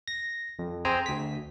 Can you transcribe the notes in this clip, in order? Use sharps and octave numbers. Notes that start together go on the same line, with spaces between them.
A#6
F2
C4 G#4 C5 G5 G#5 A#5
D2 B6